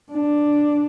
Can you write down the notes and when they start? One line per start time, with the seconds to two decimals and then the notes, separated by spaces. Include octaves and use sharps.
0.12 D4